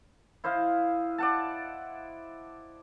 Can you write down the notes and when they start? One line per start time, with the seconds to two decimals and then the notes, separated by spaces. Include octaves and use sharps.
0.44 E4 C5 D#5 F5
1.18 D5 F#5 A5